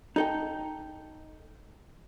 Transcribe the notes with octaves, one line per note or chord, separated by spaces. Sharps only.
D#4 A4 G5